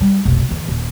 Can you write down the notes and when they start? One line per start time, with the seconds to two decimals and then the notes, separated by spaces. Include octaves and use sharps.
0.01 G3
0.25 F1 B1
0.49 G1 E2
0.68 D#1